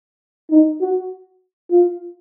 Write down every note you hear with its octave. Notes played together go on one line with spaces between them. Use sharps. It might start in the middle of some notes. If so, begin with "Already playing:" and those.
D#4
F#4
F4